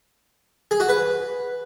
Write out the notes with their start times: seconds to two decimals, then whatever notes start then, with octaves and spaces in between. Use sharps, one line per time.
0.71 G#4
0.80 F#4
0.89 B4